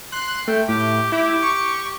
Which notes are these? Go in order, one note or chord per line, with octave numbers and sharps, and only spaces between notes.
C6 F#6
A3 G5
A2 G4
E4 G4
C#6